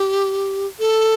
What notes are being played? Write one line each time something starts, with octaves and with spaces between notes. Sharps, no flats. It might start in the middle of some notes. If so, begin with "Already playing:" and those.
Already playing: G4
A4